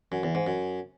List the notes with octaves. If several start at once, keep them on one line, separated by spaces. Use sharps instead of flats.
F#2
E2
G#2
F#2